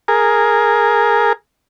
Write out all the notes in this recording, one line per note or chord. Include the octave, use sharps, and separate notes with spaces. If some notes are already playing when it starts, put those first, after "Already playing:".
G#4 A#4